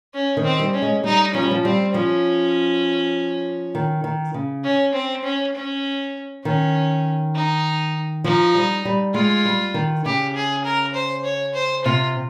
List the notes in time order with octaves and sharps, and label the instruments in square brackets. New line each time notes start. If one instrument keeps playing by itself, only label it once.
[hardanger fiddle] C#4
[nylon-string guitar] D#3
[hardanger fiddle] C4
[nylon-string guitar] G3
[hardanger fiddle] C#4
[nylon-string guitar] G#3
[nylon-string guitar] G3 [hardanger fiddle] D#4
[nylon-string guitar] F3 [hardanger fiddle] C#4
[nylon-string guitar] G3
F3
[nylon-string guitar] G3 [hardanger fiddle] C4
[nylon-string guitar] F3 [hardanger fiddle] C#4
[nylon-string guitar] D#3
D#3
C#3
[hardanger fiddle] C#4
C4
C#4
C#4
[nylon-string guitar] D#3 [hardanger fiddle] C#4
[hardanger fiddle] D#4
[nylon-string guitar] F3 [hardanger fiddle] D#4
[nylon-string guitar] G3
G3
[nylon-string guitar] G#3 [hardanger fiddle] F4
[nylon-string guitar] G3
D#3
[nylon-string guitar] C#3 [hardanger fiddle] G4
[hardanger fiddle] G#4
A#4
C5
C#5
C5
[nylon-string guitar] C3 [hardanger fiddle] F4